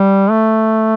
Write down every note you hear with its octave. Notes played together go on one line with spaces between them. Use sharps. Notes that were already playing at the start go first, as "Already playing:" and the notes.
Already playing: G3
A3